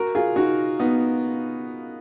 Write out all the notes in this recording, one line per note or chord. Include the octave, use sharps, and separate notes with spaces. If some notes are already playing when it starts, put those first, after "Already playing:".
Already playing: F#4 A#4
F4 G#4
D#4 F#4
B3 D#4